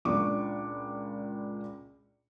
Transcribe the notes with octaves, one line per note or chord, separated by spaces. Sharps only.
C#2 A#2 A#3 D4 C#6 D6